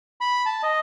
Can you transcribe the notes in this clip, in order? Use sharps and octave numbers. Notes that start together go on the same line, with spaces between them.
B5
A5
D#5